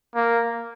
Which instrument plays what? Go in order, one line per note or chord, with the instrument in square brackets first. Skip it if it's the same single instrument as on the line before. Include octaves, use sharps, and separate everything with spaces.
[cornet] A#3